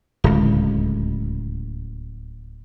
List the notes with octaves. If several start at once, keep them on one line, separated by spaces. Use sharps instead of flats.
D1 C#2